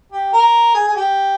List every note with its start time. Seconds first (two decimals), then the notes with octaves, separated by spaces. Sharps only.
0.12 G4
0.33 A#4
0.75 G#4
0.88 G#4
0.96 G4